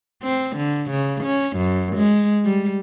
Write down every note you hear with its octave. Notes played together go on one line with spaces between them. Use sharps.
C4
D3
C#3
C#4
F#2
G#3
G3